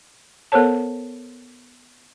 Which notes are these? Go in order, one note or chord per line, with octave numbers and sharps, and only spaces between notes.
B3 A4 A#4 C5 C#5 A5